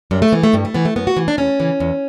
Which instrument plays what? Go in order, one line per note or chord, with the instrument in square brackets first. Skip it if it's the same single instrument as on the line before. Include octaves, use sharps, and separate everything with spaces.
[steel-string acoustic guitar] F#2 G3
A3
E3 B3
A3
G2 G3
A3
E3 B3
A3
F#2 B3
F#4
E3
D4
E2 C#4
C#3 E3
E2